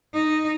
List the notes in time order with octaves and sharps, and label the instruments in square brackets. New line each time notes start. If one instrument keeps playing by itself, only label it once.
[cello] D#4